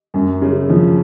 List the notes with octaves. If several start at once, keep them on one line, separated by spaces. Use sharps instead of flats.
F#2
C#3
F3